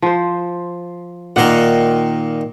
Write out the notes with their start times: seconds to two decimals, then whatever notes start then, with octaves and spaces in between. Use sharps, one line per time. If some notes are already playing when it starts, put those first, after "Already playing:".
0.02 F3 C5
1.36 A#2 D#3 A#4 F#5